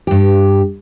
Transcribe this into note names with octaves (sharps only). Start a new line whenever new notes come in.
G2 G4